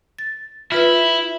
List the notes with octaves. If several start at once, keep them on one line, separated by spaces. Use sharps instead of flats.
A6
E4 F4 B4 E5